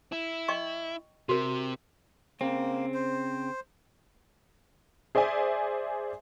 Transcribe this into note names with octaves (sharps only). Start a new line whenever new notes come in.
E4
D#5 G5 C#6
C3 F#4 A#4
C#3 A#3 C4
C5
G#4 C5 D5 E5 G#5